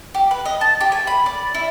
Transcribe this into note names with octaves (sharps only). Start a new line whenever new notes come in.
G4
B4
D#5
A5
G4
G#5
B5
D5
E4